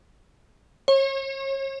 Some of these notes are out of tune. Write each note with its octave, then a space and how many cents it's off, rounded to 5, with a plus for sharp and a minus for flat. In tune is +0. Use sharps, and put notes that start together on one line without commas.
C#5 -35